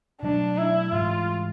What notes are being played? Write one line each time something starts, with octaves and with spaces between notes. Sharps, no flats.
B2 F#3 A3 D4
E4
G#2 E3 G3 F4